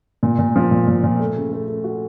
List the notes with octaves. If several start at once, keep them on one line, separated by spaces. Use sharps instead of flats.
A#2
A#2
F3
A#2
A#2
A#2
A3
C#3
A3
A3
F#4